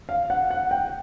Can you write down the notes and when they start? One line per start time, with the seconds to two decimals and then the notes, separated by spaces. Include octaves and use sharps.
0.09 F5
0.30 F#5
0.51 F#5
0.71 G5